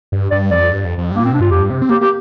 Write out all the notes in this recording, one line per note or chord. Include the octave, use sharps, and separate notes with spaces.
G2
G2 D5
F2 D5
G2
F2
F2
G2 A#3
A#2
C4
C3 D4
G2 F4
F2 G4
G2
C3
C4
A#3 G4
A#3 G4